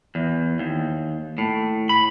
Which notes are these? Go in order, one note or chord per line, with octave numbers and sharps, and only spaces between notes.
E2
D#2
A2
B5